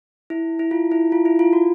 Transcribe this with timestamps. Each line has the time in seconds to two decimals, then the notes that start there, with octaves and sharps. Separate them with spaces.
0.30 E4
0.59 E4
0.71 F4
0.91 E4
1.12 F4
1.25 E4
1.39 F4
1.53 F#4